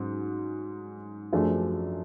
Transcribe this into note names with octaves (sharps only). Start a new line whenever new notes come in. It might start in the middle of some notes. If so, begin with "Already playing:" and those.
Already playing: G#2 F#3 C#4
F#2 F3 A3 D4 G#4